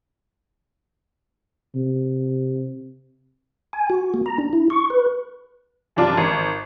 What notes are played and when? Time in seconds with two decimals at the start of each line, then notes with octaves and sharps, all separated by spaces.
1.75 C3
3.73 G#5
3.90 F#4
4.14 A#3
4.26 A#5
4.38 D4
4.53 E4
4.70 C#6
4.90 B4
5.96 F#2 C3 D4 F4
6.17 G#1